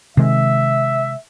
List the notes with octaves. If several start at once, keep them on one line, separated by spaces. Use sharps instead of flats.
C3 D#3 G#3 E5